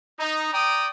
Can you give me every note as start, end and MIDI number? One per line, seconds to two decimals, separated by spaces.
0.19 0.48 63
0.52 0.87 74
0.52 0.87 79
0.52 0.87 82
0.52 0.87 87